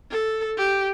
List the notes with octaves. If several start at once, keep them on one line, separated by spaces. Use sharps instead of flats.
A4
G4